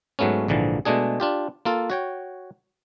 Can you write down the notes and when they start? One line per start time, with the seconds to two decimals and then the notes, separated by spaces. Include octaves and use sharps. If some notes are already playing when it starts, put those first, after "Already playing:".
0.19 G#2 F#3 A3 B3 C#4
0.48 A#1 G#2 D3 E3 F3
0.85 B2 G#3 A3 D4 G#4
1.20 D4 F4 G4
1.65 A#3 F4 A4
1.90 F#4 C#5 G5